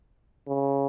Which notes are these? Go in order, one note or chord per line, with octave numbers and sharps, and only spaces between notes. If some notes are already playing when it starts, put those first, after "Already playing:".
C#3